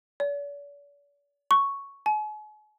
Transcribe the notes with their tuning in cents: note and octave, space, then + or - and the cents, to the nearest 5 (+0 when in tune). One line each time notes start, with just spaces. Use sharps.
D5 -45
C#6 +0
G#5 +40